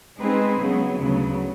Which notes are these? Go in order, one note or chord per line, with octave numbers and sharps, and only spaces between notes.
G#3 C4 D#4 G#4 B4
C#3 F#3 B3
D2 C#3 F#3 B3